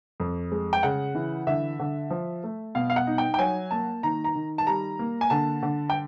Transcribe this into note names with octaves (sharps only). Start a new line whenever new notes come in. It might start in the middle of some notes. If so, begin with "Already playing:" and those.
F2
G#3
G5
C#3 F#5
E3
D3 E5
D3
F3
A3
B2 F5
F5
F#5
D#4
G5
G5
F#3 G#5
A#3 A5
D#3 A#5
A#5
D#3
A5
G3 A#5
A#3
G#5
D3 A5
D3
G5